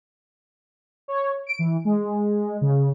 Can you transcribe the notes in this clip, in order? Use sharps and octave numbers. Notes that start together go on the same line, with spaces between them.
C#5
D7
E3
G#3
C#3